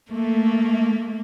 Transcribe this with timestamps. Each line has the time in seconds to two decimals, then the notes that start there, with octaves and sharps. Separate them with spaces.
0.11 A3 A#3